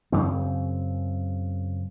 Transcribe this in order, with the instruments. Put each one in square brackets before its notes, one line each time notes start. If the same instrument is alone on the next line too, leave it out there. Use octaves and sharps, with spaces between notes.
[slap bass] F#2 C#3 C4